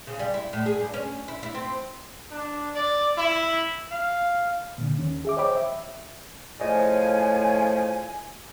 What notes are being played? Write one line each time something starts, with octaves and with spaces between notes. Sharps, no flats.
C#3
G3
E4
A2
G#4
G2
C#4
E4
E4
C4
D4
D5
E4
F5
A#2 D3
D#2 D#3 C#4
G#4 E5 D6
C5 C#5 D#5 G5 B5 D6
E5
A2 C#3 F3 D5 D#5 G#5